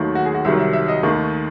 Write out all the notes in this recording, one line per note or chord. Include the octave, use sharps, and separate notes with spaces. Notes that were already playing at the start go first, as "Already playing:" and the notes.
Already playing: D#2 D#3 F#3 A3
F#4
G#4
F#4
C2 C3 D#3 F#3 E5
E5
E5
D#5
D#2 D#3 A3